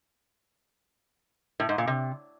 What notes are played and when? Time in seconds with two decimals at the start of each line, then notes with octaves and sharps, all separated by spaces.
1.60 A2
1.69 G#2
1.78 A#2
1.87 C3